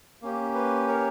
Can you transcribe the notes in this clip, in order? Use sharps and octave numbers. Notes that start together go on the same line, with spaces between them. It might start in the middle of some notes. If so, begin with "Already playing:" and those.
A#3 C#4 G4
B4
A#4 C#5